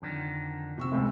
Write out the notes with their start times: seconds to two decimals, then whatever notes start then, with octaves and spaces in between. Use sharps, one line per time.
0.02 F2 D3 D#3
0.78 C3 C4 C#6 E6
0.92 F1 C#2 C3